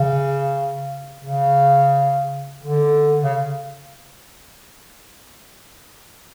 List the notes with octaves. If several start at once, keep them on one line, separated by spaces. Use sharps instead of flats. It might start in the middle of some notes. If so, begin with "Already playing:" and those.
Already playing: C#3
C#3
D3
C#3